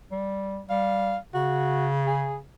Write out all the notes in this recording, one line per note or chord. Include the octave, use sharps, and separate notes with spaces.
G3
G3 F5
C#3 F#4
G#4